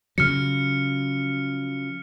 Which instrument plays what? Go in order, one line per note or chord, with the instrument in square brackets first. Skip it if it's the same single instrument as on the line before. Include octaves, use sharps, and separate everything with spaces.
[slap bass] C#3 F3 F#3 [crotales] F6 C#7